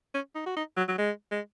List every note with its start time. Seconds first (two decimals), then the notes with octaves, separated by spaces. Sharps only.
0.14 C#4
0.35 D#4
0.46 F#4
0.56 D#4
0.77 F#3
0.88 F#3
0.98 G#3
1.31 G#3